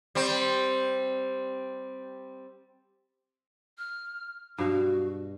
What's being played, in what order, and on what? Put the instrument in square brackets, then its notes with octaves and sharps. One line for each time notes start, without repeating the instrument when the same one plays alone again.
[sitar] G3 C4
[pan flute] F6
[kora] G2 B2 F5 [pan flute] F#4